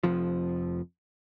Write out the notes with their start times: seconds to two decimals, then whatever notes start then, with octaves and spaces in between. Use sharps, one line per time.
0.03 F1 F2 F3